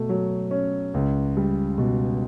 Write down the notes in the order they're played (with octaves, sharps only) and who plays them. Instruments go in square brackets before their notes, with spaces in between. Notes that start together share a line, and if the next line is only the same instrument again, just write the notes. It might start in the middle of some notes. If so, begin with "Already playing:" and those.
Already playing: [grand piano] B2 A3
F#3
C#4
C#2
G3
B2